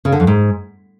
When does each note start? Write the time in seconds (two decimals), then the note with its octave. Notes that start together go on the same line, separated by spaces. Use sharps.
0.05 C#3
0.12 D3
0.20 F2
0.27 G#2